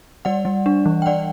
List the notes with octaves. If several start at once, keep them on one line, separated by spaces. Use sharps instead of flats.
G3 D5 F#5
G3
D4
E3
G5
E3 D5 F#5